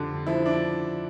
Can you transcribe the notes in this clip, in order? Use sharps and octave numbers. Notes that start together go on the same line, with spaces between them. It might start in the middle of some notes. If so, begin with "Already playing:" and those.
Already playing: F2 D3 G3
F3 E4
D4